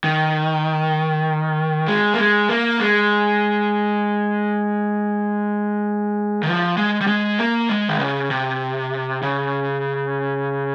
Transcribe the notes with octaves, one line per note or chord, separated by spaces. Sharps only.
D#3
G#3
A#3
G#3
A#3
G#3
D#3
F3
G#3
G3
G#3
A#3
G#3
D#3
C#3
C3
C#3